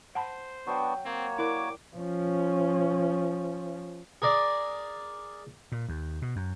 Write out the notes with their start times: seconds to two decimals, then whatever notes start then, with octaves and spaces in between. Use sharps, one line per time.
0.15 C5 F#5 A5 B5
0.67 F#3 B3 D4 F#4 G5
1.05 A#3 C4 F#4 C#5
1.38 E4 A#4 D5 D6
1.96 F3 C#4
4.22 G#4 A#4 D5
5.72 A#2
5.89 D#2
6.22 B2
6.36 F#2